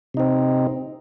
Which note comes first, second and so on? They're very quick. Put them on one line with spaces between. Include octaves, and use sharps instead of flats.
C3 D#4 C4